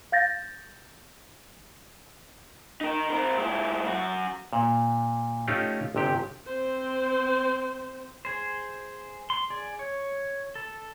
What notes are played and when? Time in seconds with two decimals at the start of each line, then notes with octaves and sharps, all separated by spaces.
0.12 F5 G6 A6 A#6
2.81 D#4 A#4
3.10 C4 A#4
3.38 G#2 E4
3.87 F#2 F#4
4.53 A#2
5.48 A3 C#4 D#4 F4 G4
5.95 G1 C3 G4
6.47 C4 C5
8.25 G#4 C5
9.30 C6
9.50 G#4 D5
9.79 C#5
10.55 A4